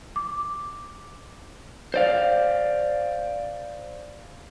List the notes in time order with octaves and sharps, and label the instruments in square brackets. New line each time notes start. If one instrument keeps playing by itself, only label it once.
[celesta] D6
[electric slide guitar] C5 D5 F5